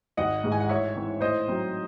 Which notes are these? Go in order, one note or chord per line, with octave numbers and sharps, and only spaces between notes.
G#1 D#5 F#5
G#2 E3 G#3
G#5
F#5
A2 C#5 E5
E3 C4
A2 C5 D#5
F#3 C4 D#4